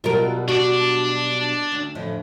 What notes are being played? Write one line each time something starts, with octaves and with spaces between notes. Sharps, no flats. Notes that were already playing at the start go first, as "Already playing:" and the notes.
B2 F#3 G3 F4 A#4
D4 F#4 D5
D2
F2 A2 E3